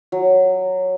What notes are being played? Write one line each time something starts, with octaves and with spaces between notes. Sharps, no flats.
F#3